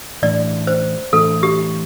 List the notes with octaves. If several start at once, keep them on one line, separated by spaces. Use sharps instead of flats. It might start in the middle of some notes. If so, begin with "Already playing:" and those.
A2 E3 A3 D4 D5
C5
A2 E3 A3 D4 A4
G4